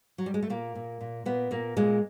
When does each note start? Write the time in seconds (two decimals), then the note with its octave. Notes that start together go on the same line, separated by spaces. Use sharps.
0.18 F#3
0.26 G3
0.34 G#3
0.43 A3
0.50 A#2 A#3
0.75 A#2
1.01 A#2
1.26 A#2 B3
1.51 A#2 A#3
1.77 A#2 G#3